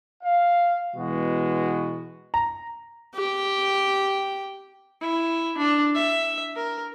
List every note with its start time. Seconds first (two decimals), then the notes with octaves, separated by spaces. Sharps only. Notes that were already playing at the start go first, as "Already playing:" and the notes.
0.23 F5
0.95 B2 E3 G#3 B3 F#4
2.34 A#5
3.14 G4 G5
5.01 E4
5.57 D4
5.95 E5
6.56 A#4